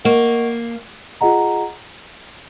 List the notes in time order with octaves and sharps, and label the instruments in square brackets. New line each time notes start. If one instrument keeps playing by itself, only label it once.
[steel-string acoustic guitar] A#3 [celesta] A#4 D#5 F#5 C#6
[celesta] F4 G#4 D#5 F#5 A#5